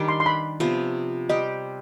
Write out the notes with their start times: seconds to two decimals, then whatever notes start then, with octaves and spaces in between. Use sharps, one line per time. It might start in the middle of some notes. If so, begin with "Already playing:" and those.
Already playing: D#3 G3 D4
0.09 C6
0.20 C6
0.26 B5
0.60 C3 F3 B3
1.29 G3 C4 G4 D#5